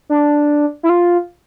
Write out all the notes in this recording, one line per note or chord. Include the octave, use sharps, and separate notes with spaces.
D4
E4
F4